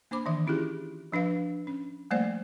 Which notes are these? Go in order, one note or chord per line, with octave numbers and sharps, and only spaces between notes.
A#3 D4 C5 B5 D6
D#3 E3 E5
C#4 E4 F4 G4 G#4
F3 D4 B4 F5
C#4
F3 G3 A3 A#3 C5 D5